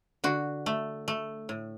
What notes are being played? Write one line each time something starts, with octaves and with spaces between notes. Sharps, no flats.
D3 F#4
A3
A3
A2